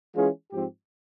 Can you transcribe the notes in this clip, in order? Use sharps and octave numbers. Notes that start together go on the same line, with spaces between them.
E3 G#3 C#4 F4 G#4
G#2 F3 C4 G4